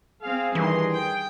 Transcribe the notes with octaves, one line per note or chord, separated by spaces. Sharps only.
C4 G#4 F5
G2 D#3 E3 C6
G5